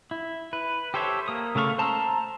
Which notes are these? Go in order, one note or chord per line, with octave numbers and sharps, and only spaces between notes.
E4
B4
G4 A4 C5 C#5 E5
A#3 D#6
C#3 A3 A4 F5 C#6
C5 A5 A#5 C6 E6